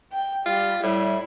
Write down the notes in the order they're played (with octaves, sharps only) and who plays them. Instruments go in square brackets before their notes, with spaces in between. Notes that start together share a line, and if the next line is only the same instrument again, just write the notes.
[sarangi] G5
[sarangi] G3 [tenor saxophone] F4
[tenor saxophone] A2 [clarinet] G3 [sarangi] E4